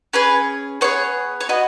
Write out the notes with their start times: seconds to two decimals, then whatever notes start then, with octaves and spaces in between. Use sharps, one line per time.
0.13 C#4 G#4 B4
0.81 B3 G#4 C#5
1.41 C#5
1.49 B3 F#4 D#5